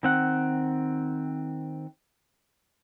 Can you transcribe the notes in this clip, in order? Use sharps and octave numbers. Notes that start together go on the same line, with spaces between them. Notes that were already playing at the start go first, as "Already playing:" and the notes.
D#3 C4 F#5